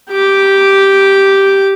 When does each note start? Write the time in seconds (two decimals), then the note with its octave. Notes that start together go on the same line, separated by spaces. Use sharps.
0.11 G4 D6